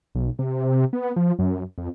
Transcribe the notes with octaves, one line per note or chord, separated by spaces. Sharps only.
B1
C3
B3
F3
F#2
F2